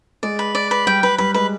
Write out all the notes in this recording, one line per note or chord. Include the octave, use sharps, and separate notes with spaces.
G#3 D5
B4
D5
B4
G3 G5
G3 B4
G3 B4
G#3 B4